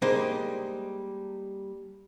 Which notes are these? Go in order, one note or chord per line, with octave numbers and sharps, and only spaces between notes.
G3 G#3 A#3 D4 D#4 C5